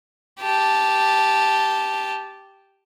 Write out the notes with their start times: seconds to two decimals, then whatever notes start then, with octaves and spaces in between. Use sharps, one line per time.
0.41 G4 A5